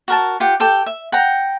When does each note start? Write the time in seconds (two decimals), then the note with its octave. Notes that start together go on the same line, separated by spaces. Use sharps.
0.08 F#4 A#4 A5
0.40 F4 G4 F#5
0.60 G4 A4 G5 D6
0.86 E5
1.12 F#5 G5 A#5